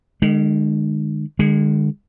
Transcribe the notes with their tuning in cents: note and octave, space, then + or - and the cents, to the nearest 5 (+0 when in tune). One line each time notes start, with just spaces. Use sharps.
D#3 -45 G#3 +0
D3 +35 G#3 -20